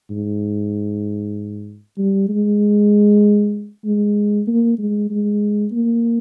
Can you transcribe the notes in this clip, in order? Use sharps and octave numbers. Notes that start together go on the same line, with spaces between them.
G#2
G3
G#3
G#3
A#3
G#3
G#3
A#3